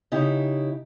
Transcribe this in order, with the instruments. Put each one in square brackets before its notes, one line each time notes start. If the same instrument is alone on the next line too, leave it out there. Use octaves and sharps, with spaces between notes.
[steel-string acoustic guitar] C#3 D#4 E4 G4